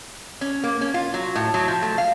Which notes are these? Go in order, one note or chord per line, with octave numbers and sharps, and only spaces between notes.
C#4
A#3
C#4
F4
F#3
A2
F#3
F3
A3
F5